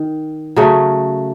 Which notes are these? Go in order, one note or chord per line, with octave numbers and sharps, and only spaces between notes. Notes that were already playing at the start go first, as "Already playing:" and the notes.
Already playing: D#3
C#3 F#3 A3